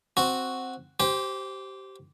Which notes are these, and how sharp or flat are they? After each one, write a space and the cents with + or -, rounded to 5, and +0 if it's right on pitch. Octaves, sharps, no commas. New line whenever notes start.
C4 +0 F#4 +0
G4 -20 C5 +0 G5 +20